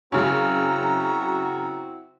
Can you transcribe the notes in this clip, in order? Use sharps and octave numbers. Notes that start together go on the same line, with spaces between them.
F#2 C#3 C4 C#4 E4 F#4 A#5